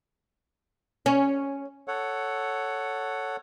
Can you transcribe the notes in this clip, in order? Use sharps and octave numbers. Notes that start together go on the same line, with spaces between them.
C#4
A4 C#5 F#5